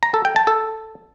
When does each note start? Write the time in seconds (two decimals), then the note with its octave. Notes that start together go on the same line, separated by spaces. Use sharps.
0.03 A#5
0.14 A4
0.25 G5
0.36 A5
0.47 A4